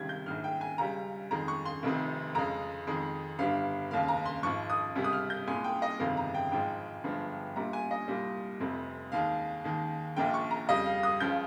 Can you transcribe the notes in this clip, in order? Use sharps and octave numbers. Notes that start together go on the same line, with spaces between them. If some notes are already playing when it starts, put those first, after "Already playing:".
Already playing: C#2 C3 D#3 G3 G#6
G6
A#1 G#2 D#3 F6
G5
G#5
C#2 C#3 G3 A#5
F2 D#3 G#3 A#5
C#6
C6
F1 F2 C3 D#3
F2 C#3 G#3 A#5
F2 D#3 G#3
G1 G2 G3 F5
F1 D#2 C#3 F5
A#5
C6
G#1 G#2 F3 C#6
D#6
C#2 C3 G3
D#6
F6
G6
C2 A#2 G#3 G#5
G5
D#5
G1 F2 C3 D#3 G#3 F5
A#5
G5
G#1 G#2 F3 G#3 G5
G1 G2 F3 G#3
A#1 A#2 G3 A#5
G#5
D#5
C2 A#2 G3
F1 F2 C3
D#2 D#3 G#3 F5
D#2 D#3 G#3
A#1 A#2 F3 G#3 G5
C#6
A#5
F2 C#3 G3 D#5
F5
D#6
C#2 C#3 F3 G6